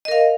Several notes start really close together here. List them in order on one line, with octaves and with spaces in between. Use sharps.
D#5 A#4 F5